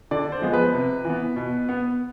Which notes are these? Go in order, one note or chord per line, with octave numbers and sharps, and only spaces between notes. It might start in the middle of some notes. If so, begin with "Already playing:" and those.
D3 D5
C5
F3 G#3 B3
B4
C3
E3 B3
B2
B3